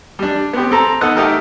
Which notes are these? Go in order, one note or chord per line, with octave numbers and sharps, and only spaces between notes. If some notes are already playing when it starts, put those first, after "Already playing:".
G3 D4
B3 C4 G4
C4 A4 A#5
B3 D#4 A4 D#5 F#5
A3 D#4 G4 A4 A#4